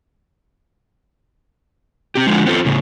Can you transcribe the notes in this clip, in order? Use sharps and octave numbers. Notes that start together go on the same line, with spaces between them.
C4 G4
D3 F3 G#3
B3 C4 F4 A4
A2 C#3